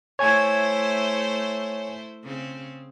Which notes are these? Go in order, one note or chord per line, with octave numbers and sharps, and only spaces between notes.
A3 E4 C5 C#5 G#5 G#6
C#3 C4